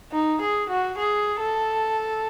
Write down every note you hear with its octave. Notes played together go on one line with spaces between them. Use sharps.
D#4
G#4
F#4
G#4
A4